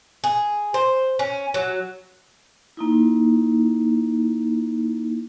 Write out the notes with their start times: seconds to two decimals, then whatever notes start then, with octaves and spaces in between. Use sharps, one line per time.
0.24 G#4
0.74 C5
1.19 C#4
1.54 F#3
2.77 A#3 D#4 E4